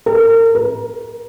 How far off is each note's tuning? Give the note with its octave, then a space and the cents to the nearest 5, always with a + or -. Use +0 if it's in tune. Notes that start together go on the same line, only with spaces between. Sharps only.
A#4 -35
A#4 +20